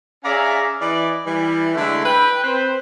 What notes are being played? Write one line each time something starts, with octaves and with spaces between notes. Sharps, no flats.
C#4 G#4 D5 E5 F5 A#5
E3 D5 D#5
E3 G3
D3 G#3 A3 E4
B4 G5
C4 B4 C5